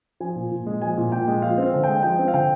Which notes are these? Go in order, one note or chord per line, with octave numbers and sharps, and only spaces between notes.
F3 G#5
A#2
A#2
G#3
F3 G#5
A#2
A#2 G5
G#3
F3 F5
C4 F5
D3
G5
G#3
F3 G5
C4
F5
D3 G5